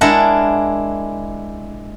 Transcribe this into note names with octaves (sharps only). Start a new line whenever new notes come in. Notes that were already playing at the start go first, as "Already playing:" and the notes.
G#3 D4 E4 A#4 D5 F#5